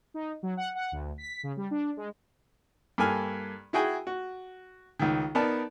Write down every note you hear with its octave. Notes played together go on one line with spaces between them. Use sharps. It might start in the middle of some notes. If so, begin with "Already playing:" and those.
D#4
F#3
F#5
F#5
D2
B6
C#3
G3
D4
G#3
G2 A#3 A4 G#5 F6
E4 F#4 G#4 G5 G#5
F#4
C#2 D#3
B3 D#4 A#4 D5 A5